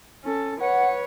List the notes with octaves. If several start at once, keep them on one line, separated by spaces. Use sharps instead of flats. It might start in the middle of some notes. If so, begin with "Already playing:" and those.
C#4 A4
B4 C#5 F#5